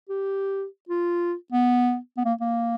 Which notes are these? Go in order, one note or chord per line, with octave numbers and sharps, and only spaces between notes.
G4
F4
B3
B3
A#3
A#3